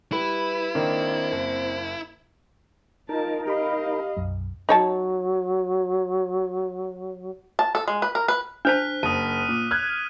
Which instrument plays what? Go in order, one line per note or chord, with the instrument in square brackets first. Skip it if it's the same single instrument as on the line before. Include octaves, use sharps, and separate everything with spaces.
[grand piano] G3 [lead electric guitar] E4 [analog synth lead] B4
[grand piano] D#3 A#3 D4 [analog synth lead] C4
[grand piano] F#1
[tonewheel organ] D#4 A#4 [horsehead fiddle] F4 A5
[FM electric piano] G4 B5 [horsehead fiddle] D#5 F5
[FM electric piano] B1 F#2
[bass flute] F#3 [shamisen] D#4 C#5 A5
[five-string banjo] A5
A4
G#3
B4
A#4
B4
[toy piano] D4 C5 A5 [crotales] F6 F#6 B6
[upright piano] F#1 [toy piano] A5 [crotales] D#6 D#7
[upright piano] A#2
F6 F#6 G#6